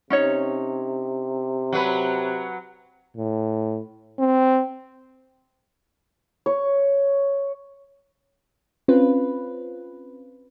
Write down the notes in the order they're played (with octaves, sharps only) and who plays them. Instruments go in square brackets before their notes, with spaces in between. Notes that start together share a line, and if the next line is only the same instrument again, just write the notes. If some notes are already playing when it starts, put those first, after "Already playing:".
[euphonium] C3 [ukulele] C#4 D#4 C#5
[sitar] F#3 B4
[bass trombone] A2
C4
[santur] C#5
[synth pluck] C4 C#4 F4 B4